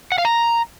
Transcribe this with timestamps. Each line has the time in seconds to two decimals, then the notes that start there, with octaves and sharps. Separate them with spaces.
0.12 F#5
0.18 F5
0.25 A#5